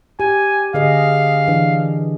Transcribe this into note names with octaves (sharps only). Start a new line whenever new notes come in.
G4 G#5
D3 G#4 D#5 F5
E3 D4